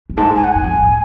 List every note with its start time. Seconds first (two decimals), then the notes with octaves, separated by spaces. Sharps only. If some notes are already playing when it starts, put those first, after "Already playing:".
0.10 F#2
0.17 G#2 A5
0.36 A2 G#5
0.44 F#5
0.52 F#2 G#5
0.64 F2
0.74 G#2
0.82 A2